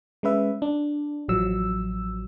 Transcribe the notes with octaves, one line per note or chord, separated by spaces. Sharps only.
G#3 C#4 B4 E5
D4
A1 F3 F#3 E6